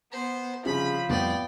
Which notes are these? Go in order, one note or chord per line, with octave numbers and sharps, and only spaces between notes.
B3 C5
C2 C#3 F3 B5
F2 A2 G3 B3 D5 G5